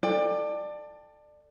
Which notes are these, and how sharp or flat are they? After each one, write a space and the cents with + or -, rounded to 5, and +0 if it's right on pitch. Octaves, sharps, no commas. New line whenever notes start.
A4 +10 D5 +25 G5 +35